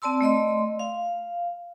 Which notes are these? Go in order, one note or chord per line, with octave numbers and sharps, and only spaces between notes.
C4 D5 A5 C6 E6
A3 D5 D#5 C6
F5